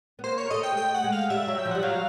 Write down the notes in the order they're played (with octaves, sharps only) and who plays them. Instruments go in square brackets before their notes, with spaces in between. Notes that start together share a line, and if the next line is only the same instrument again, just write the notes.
[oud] B3
[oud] A#3 [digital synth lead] C5
[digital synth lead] C#5
[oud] A#3
[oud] A3 [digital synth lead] D#5
[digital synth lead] G5
[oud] G#3
[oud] A3 [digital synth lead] G5
[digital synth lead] F#5
[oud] G#3
[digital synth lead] F5
[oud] G3 [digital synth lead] E5
[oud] F#3
[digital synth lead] G5
[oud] F3
[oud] G3 [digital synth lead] F#5
[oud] F#3 [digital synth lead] F5